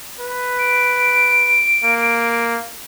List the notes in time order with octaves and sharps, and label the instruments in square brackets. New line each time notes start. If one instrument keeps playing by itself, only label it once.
[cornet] B4
[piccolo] D7
[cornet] A#3